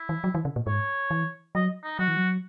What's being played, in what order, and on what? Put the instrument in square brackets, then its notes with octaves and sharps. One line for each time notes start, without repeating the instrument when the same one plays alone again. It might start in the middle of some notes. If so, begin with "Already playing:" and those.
Already playing: [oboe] E4
[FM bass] E3
F#3
E3
C#3
A#2
[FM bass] G#2 [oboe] C#5
[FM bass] E3
[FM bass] F#3 [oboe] D#5
[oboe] D#4
[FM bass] F#3 [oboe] F#4
[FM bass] E3
F#3